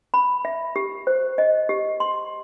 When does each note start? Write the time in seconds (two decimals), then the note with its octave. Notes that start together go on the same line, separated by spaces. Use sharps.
0.14 B5
0.45 E5
0.76 G4
1.07 C5
1.38 D#5
1.69 G4
2.00 C6